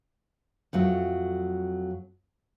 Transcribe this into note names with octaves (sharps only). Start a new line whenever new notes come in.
F2 F#3 A3